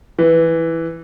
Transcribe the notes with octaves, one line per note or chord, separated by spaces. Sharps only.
E3